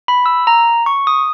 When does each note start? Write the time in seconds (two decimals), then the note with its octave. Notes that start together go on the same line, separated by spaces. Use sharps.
0.08 B5
0.26 E6
0.47 A#5
0.86 C#6
1.07 D#6